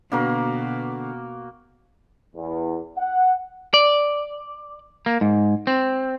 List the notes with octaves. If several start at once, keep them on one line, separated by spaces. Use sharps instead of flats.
B2 D3 A#3 B3 D4 F#4 A#4
E2
F#5
D5
A#3
G#2
C4